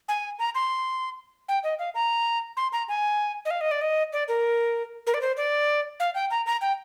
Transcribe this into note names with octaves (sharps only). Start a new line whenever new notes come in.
G#5
A#5
C6
G5
D#5
F5
A#5
C6
A#5
G#5
D#5
F5
D#5
D5
D#5
D5
A#4
A#4
D5
C5
D5
F5
G5
A#5
A#5
G5